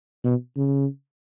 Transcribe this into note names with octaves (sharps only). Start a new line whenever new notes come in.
B2
C#3